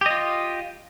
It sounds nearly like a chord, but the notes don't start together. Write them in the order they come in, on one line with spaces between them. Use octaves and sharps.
G4 D#5 F4